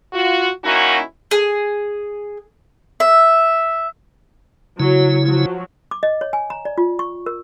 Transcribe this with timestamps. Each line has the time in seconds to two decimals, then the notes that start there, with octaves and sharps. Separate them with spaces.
0.13 F4 F#4
0.64 A#3 C#4 D#4 E4 F#4
1.31 G#4
3.00 E5
4.80 C#3 F#3 E4
5.25 F3 F#3 F#4
5.91 D6
6.03 D#5
6.21 C#5
6.33 G#5
6.50 A#5
6.65 D5
6.78 F4
6.99 C#6
7.26 A#4